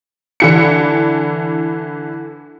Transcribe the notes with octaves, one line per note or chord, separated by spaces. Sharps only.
D3 E3 C#7